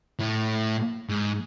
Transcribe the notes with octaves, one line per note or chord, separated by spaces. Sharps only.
A2
G#2